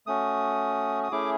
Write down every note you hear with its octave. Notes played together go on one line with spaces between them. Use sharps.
A3 C#4 F#4 D#6
D#6
A3 C#4 E4 G#4 D6